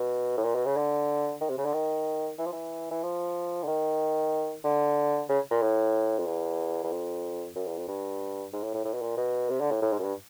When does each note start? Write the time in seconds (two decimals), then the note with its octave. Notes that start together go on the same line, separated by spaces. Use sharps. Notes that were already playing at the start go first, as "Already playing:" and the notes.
Already playing: B2
0.38 A2
0.44 A#2
0.55 B2
0.66 C#3
0.77 D3
1.41 D#3
1.50 C3
1.58 C#3
1.65 D3
1.73 D#3
2.39 E3
2.46 F3
2.53 E3
2.91 E3
3.03 F3
3.63 D3
3.68 D#3
4.65 D3
5.29 C#3
5.51 A#2
5.62 A2
6.19 F2
6.26 E2
6.83 E2
6.91 F2
7.56 F#2
7.66 E2
7.77 F2
7.88 G2
8.53 G#2
8.63 A2
8.74 A2
8.85 A2
8.94 B2
9.02 A#2
9.17 B2
9.50 C3
9.60 D3
9.71 A2
9.82 A2
9.93 G#2
9.99 F#2
10.04 G2